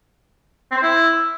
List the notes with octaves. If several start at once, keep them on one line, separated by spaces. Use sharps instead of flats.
C4
C5
E4